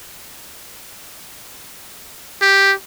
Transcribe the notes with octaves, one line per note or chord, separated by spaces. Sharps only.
G4